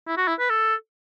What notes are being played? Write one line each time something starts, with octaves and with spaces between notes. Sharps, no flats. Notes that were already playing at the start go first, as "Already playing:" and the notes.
E4
F#4
E4
B4
A4